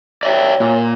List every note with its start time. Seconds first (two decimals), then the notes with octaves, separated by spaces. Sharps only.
0.23 C#5 D5 E5 G5
0.60 A#2